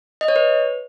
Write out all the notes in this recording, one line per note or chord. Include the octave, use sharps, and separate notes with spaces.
D#5
C#5
B4